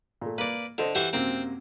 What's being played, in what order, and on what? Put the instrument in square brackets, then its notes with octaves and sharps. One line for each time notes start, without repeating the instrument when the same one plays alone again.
[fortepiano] A#2 A3
[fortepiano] A#3 [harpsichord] B4 D5
[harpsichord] D3 [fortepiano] A4 C5 D#5
[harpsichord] E3 F#4 C5 [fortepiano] G4
[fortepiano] F#2 C3 A#3 [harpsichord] C4